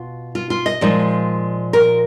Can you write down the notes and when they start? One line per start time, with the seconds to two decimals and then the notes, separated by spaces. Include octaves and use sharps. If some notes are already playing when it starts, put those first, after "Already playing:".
Already playing: B2 F4
0.35 F4
0.50 F4
0.66 D#5
0.81 A#2 F3 G#3 D#4
1.73 A#4